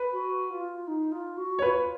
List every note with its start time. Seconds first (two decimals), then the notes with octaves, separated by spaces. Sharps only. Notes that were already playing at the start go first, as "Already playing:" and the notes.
Already playing: B4
0.12 F#4
0.50 F4
0.87 D#4
1.12 F4
1.37 F#4
1.59 C#5
1.62 F4 B4